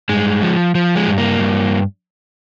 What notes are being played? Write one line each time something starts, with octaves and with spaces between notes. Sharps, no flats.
G2 G#3
F3
F3
G#3
G2
A#3
G2